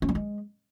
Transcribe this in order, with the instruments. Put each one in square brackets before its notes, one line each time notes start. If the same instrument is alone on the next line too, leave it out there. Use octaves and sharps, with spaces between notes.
[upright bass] C#4
G3
G#3